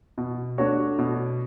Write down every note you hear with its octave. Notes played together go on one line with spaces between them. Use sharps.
B2
A3 D4 F#4 C#5
B2